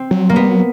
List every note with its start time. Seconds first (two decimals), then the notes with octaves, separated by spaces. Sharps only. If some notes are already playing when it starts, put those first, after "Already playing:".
Already playing: C4
0.11 F#3
0.29 F#3 A#3
0.36 G3 B3
0.49 F#3